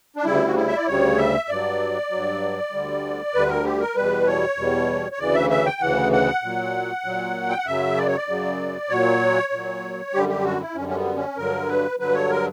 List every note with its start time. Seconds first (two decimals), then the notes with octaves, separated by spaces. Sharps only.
0.16 D4
0.25 D2 C#3 G3 E4
0.47 F#4
0.56 E4
0.68 E5
0.77 D5
0.87 D2 C#3 G3 C#5
1.18 E5
1.48 G2 F#3 D5
2.10 G2 F#3
2.72 D2 D3 G3
3.34 D2 D3 G3 B4
3.49 A#4
3.64 G4
3.80 A#4
3.96 E2 B2 G3 B4
4.27 C#5
4.57 E2 B2 G3
5.12 C#5
5.19 D2 C#3 E3 D5
5.34 E5
5.50 E5
5.66 G5
5.81 D2 C#3 E3 F#5
6.12 F#5
6.43 A#2 F#3
7.04 A#2 F#3
7.49 G5
7.58 F#5
7.66 F#2 C#3 F#3 E5
7.97 D5
8.07 C#5
8.17 D5
8.28 F#2 C#3 F#3
8.90 A#2 F#3 C#5
9.52 A#2 F#3
10.13 F#2 D3 G3 G4
10.29 G4
10.44 F#4
10.60 E4
10.75 F#2 D3 G3 C#4
10.89 C#4
10.96 B3
11.16 C#4
11.37 G2 D3 F#3 A#4
11.68 B4
11.99 G2 D3 F#3 B4
12.15 C#5
12.30 A#4